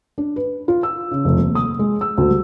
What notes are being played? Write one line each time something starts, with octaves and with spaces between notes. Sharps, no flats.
D4
B4
F4
E6
C#3
F1
D#1
D#6
G#3
E6
D2
G3